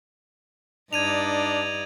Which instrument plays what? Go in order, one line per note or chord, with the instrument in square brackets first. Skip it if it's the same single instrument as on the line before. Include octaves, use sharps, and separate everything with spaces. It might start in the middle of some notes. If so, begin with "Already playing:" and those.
[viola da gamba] G2 D#4 D5 [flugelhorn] D4 [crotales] G#6 D#7 F7